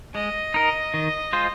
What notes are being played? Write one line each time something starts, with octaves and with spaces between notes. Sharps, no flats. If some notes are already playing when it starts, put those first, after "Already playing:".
G#3 D#5
D#4 A#4
D#3
G#3 F4 C5